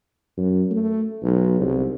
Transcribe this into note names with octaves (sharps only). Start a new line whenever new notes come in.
F#2
A3
B1
C2